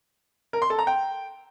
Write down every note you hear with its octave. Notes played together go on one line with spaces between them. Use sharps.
A#4
C6
A4
A#5
G5